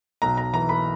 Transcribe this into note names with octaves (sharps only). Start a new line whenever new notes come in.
B1 A#5
A#5
E3 A#5
B5